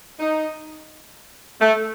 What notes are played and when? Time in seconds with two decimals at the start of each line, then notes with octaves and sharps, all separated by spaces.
0.19 D#4
1.60 A3